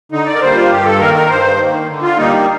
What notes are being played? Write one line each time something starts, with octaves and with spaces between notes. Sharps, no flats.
D3 D#4
D5
A#4
G3 A#3 C5
F4
G2 G4
A4
D#3 A#3 A#4
A#4
G2 C5
D#3 A#3
D3
F4
G3 A#3 D#4